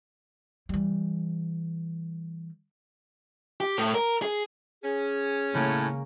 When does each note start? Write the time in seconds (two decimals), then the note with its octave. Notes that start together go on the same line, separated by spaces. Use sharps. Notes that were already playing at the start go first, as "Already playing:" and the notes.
0.69 E3 G3
3.60 G4
3.78 A2
3.95 A#4
4.22 G#4
4.83 C#4 G#4
5.54 A2 C#3 A#3